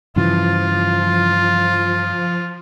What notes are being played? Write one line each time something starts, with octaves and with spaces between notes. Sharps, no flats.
G2 C#3 E3 F3 F4